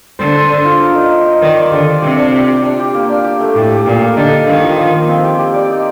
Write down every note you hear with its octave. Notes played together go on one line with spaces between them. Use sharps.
D3 C5
C5
D4
F4
A#4
D#4
D#4
D#5
D#3 D5
D5
D3 G4
D5
C3 G4
D4
G4
G4
D4
G4
A#3
D4
G4
A3
A2 G4
G4
A#2 A#4
A#3
D3 D#4
A#3
D#3 A#3
F3
F3
A#3
C4
G4
G4
D5
D#4